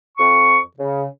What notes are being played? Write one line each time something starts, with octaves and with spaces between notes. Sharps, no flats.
F2 C#6
C#3